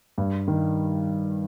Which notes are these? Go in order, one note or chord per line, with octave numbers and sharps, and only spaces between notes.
G2
D#3